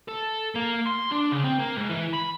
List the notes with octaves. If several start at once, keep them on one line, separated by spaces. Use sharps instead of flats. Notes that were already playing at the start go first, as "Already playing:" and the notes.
A4
A#3
C6
D4
C#3
C4
A#3
G#2
E3
B5